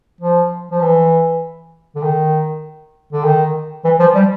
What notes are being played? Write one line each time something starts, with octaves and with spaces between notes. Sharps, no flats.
F3
F3
E3
D3
D#3
D3
D#3
E3
F3
G3